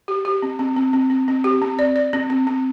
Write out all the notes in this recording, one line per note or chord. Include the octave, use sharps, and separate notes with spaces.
G4
G4
C4
C4
C4
C4
C4
C4
G4
C4
D5
D5
C4
C4
C4